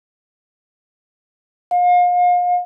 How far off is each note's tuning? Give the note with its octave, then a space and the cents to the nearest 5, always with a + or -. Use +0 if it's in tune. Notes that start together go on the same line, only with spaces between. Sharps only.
F5 +35